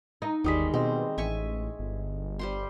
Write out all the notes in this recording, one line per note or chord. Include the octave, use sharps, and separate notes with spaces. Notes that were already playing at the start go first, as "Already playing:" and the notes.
D#4
G1 D#2 D#3 G3 G#3 D#6 B6
B2 C4 G#4 D#5
A1 E5 G#5 C#6
G1
G3 C5 C6